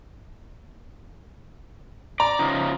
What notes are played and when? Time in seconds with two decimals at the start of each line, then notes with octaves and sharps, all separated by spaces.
2.20 D5 A#5
2.39 C#3 F3 D#4